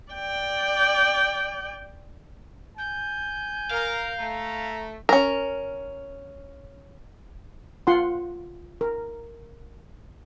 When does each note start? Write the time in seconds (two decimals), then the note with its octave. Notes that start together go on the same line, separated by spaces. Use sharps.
0.13 D5 G5
2.77 G#5 G6
3.71 A#4 F5
4.19 A3 A#5
5.09 C#4 A#4
7.87 F4 F#5 C6
8.81 A#4